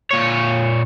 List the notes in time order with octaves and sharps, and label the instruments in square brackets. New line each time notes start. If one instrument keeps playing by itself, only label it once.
[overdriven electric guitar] A#2 C#5